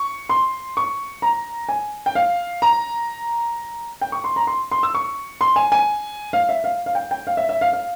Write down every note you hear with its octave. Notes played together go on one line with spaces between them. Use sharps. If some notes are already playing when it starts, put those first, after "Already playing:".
Already playing: C#6
C6
C#6
A#5
G#5
G5
F5
A#5
G5
C#6
C6
A#5
C6
C6
E6
C#6
C6
G#5
G#5
F5
E5
F5
F5
G5
G5
F5
E5
E5
F5
F5